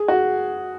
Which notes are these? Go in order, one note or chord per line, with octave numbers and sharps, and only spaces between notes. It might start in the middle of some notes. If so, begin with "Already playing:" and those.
Already playing: G#4
F#4